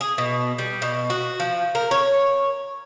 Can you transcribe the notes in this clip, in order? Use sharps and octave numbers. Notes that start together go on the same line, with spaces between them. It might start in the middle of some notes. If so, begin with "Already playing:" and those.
G#4
B2
G3
B2
F#4
F3
A#4
C#5